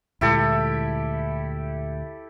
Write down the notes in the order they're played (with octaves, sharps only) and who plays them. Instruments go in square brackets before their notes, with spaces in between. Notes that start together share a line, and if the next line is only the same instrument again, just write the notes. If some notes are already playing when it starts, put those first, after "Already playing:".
[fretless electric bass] D2 A#2 G#3 [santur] E4 G4 A4